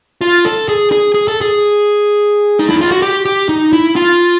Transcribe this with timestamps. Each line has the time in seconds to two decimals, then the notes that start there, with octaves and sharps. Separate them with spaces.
0.21 F4
0.45 A4
0.69 G#4
0.92 G#4
1.14 G#4
1.28 A4
1.41 G#4
2.59 D#4
2.70 E4
2.81 F4
2.92 F#4
3.02 G4
3.25 G4
3.49 D#4
3.73 E4
3.96 F4